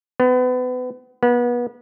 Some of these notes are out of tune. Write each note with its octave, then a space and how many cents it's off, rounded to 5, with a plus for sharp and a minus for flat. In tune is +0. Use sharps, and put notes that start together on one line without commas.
B3 +30
B3 -30